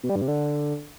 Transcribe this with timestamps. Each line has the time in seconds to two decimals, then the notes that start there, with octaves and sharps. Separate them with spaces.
0.03 B2
0.09 G3
0.16 G2
0.22 C3
0.28 D3